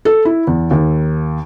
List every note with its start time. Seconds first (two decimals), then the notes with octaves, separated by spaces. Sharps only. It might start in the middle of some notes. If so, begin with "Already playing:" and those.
0.05 A4
0.25 E4
0.47 E2
0.71 D#2